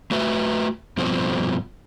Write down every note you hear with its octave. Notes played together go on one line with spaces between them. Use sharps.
A3 F#4 B4 E5
G2 B2 F3 C4